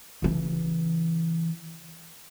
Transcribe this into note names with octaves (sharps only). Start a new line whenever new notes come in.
C#3 E3